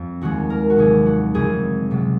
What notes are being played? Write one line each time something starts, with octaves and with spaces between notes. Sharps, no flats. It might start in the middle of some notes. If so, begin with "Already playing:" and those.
Already playing: F2
D#2 D#3 G#3 F#4
A#4
F#4
F1 D#2 D#3 F#3 G#4
F#4
F1 F2 C#3 G#3 G#4
C#2 C3 F#3